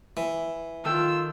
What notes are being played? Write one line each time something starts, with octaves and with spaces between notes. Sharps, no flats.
E3
D#3 F4 A4 G5 E6